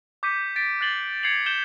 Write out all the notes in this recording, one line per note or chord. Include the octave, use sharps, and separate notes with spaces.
D6 G6 B6 C#7 D#7
A6 B6 D7
F#6 A6 C7 F#7 G7
G#6 C7 C#7 F7 F#7
G6 E7 G7